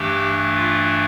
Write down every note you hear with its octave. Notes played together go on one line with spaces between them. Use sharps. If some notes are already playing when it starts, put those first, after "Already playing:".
Already playing: G2 E3 A3 D4 G4
F4